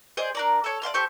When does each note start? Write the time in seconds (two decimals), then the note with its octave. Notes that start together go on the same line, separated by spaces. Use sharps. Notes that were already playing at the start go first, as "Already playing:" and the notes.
0.17 G#4 C5 D5 D#5
0.35 D4 A#4 D5
0.64 A4 C#5
0.82 D5 F5 C6 F6
0.94 G4 A4 C5 C#6